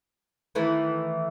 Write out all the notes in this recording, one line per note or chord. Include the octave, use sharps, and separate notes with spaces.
D#3 E3 A3